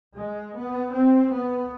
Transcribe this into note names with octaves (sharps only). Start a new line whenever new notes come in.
G#3
B3
C4
B3